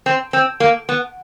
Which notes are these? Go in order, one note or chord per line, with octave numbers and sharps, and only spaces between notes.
C4
C4
A#3
B3